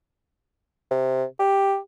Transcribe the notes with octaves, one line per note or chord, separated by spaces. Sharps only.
C3
G4